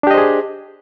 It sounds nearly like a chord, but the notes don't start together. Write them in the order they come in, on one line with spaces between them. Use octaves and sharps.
D4 G4 D#5 C5 G#4